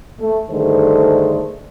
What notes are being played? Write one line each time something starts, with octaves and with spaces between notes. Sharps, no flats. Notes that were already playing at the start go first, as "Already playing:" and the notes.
A3
G2 D3 D#3 A3 G#4 C5